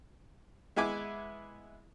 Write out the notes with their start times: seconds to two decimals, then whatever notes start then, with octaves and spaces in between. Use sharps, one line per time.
0.76 G#3 B3 E4 G#5 B5 D6